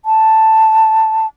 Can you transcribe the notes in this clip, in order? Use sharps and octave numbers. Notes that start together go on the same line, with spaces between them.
A5